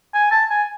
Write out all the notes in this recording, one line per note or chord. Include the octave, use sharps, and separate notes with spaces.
G#5
A5
G#5